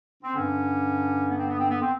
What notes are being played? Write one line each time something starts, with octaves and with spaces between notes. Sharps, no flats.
C4
G2 D3 C#4
B3
C4
B3
C4
B3
C4